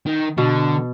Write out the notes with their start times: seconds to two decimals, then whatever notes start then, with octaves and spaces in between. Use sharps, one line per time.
0.06 D#3
0.38 B2 D3